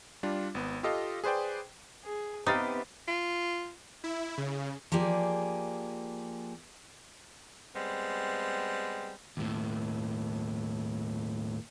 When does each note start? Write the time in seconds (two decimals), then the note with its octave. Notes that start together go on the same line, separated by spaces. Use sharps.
0.23 G3 D4 F4
0.55 G#1 B3
0.83 F4 G4 A4 D#5 F5
1.24 G#4 B4 C5 D5 G5
2.04 G#4
2.46 C3 B3 D#4 G4 B4 F5 G5 A6
3.08 F4
4.04 E4
4.38 C#3
4.92 F3 A#3 G4 G#4 D5
7.76 G3 G#3 B3 C4
9.37 D#2 A2